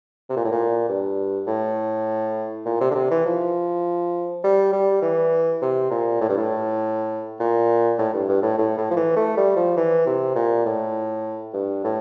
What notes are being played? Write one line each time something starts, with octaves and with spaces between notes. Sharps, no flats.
C3
A#2
A2
A#2
G2
A2
A#2
C3
D3
C3
E3
F3
G3
G3
E3
C3
A#2
A2
G2
A2
A#2
A2
G2
G2
A2
A2
A2
F3
E3
A3
G3
F3
E3
C3
A#2
A2
G2
A2